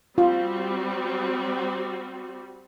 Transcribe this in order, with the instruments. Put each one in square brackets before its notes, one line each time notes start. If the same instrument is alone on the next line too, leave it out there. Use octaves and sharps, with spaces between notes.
[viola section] G3 C4 F#4 [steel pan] F4